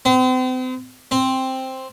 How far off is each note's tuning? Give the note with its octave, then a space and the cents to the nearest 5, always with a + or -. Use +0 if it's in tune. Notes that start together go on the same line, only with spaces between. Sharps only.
C4 -40
C4 +5